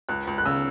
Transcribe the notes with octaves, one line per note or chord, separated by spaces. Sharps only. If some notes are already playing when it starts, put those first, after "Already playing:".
C#2 F#6
C#2
F#6
C#3 E6